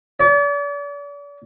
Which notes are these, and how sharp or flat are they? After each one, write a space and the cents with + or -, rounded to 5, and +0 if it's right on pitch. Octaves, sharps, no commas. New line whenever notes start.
D5 -40